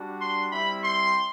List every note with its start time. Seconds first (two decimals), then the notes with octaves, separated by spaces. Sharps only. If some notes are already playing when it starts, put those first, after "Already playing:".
Already playing: G3 D4 F#4
0.20 C6
0.51 G3 C4 E4 B5
0.83 C6